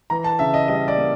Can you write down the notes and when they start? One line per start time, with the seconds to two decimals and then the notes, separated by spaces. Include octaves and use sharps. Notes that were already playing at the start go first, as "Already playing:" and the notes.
0.10 E3 A#5
0.24 A5
0.39 C#3 E5
0.54 D#5
0.68 G3 D#5
0.88 D5
0.97 A#3